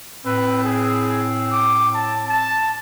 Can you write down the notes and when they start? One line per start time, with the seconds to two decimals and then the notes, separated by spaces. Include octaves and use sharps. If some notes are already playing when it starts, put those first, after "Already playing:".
0.25 A2 C4 B4
0.64 G#4
1.52 D6
1.94 A5
2.28 A5